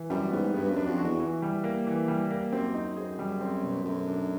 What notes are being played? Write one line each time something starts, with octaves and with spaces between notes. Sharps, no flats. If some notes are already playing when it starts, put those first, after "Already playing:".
Already playing: E3
F#2 G3
G#2 B3
G2 B3
F#2
D4
F2
F#4
E2
E3
G3
A#3
E3
G3
A#3
F#2 C4
D#4
G#4
G3
C4
B2
F#2 A3
D4